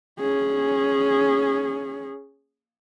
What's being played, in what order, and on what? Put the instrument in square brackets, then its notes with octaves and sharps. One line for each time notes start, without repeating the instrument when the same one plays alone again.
[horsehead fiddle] C#4 G#4